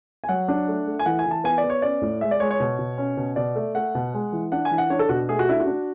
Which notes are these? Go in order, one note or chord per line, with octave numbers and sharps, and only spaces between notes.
G#5
F#3 F#5
D4
A3
A3
G#5
E3 F#5
G#5
E3
A5
B3 G#5
D5
B3
C#5
C#4 D5
A2
G#3 E5
D5
G#3 C#5
C#5
B2
B2
C#4
B2
B2 D5
A3
A3 F#5
B2
G#3
E3
D4 F#5
G#5
E3
F#5
D4 C#5
A4
B2 F#4
A3 G#4
F#4
D4 E4
F#4
D4